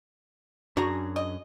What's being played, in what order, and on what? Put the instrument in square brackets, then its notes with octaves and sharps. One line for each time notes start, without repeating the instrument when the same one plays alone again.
[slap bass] F#2 [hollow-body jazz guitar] D4 G#4 A#5 [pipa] F#4
[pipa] D#5